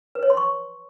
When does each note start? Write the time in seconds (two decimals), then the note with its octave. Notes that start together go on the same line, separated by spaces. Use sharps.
0.15 B4
0.23 C#5
0.30 C6
0.37 C#6